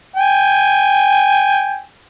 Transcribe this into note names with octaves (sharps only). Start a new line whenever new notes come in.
G5 G#5